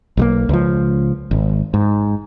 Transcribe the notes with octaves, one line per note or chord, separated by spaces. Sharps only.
B1 G3 A#3
C#2 F3
G#1
G#2